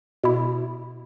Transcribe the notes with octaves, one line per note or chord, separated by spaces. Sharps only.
B2 E4